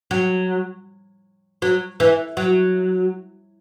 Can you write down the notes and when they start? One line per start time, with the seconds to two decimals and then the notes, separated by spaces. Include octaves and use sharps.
0.11 F#3
1.62 F#3
2.00 E3
2.37 F#3